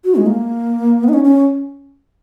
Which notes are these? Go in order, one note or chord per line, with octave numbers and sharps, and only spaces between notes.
F#4
G#3
A#3
B3
D#4
C#4
C#4